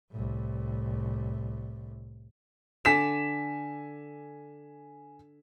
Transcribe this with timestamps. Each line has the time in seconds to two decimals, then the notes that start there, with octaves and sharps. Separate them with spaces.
0.12 C2 A2
2.85 D3 G#5 B6 E7